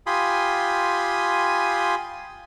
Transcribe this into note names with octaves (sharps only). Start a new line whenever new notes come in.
F4 G4 G#5 B5 C6 D#6